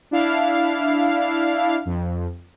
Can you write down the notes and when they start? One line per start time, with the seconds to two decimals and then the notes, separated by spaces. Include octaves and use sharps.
0.11 D4 E4 F5
1.85 F2